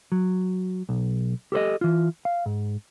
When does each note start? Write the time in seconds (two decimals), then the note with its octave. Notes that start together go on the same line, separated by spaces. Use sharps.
0.12 F#3
0.89 B1
1.52 G4 A4 C5 D#5
1.81 E3 F4
2.25 F5
2.46 G#2